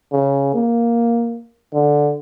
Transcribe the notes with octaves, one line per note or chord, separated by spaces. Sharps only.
C#3
A#3
D3